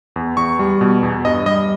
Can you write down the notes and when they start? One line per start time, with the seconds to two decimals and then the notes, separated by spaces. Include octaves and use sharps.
0.16 E2
0.37 E2 C#6
0.59 G3
0.81 B2
1.03 E2
1.25 G2 D#5
1.46 G3 D#5